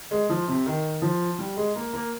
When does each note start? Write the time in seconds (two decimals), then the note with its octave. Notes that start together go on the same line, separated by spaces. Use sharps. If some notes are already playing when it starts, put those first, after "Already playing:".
0.11 G#3
0.29 F3
0.48 C3
0.66 D#3
1.02 F3
1.39 G3
1.57 G#3
1.75 A#3
1.93 A#3